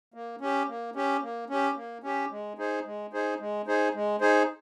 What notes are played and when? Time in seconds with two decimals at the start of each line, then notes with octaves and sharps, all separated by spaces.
0.14 A#3
0.41 C#4 G4
0.68 A#3
0.96 C#4 G4
1.23 A#3
1.50 C#4 G4
1.76 A#3
2.04 C#4 G4
2.31 G#3
2.59 D#4 G#4 C5
2.85 G#3
3.13 D#4 G#4 C5
3.40 G#3
3.67 D#4 G#4 C5
3.95 G#3
4.21 D#4 G#4 C5